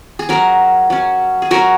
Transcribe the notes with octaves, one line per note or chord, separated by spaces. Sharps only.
G#4
F#3 C#4 F#4 A#4
F#3 C#4
G#4
F#3 C#4 F#4 A#4